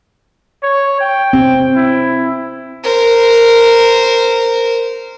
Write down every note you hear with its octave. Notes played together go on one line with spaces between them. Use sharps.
C#5
G5
C4
E4
A#4 C5